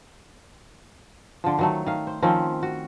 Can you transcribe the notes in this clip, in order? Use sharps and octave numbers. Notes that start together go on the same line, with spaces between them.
D3 F3
D#3 F#3 A3
D#3 F5
C5
D#3 F3 C4 C#4
F#4